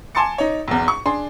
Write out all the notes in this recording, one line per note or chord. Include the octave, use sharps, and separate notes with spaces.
G#5 A5 C6 D6 A6 C#7
D#4 C#5
B1 E2
C#6
D4 G#4 C6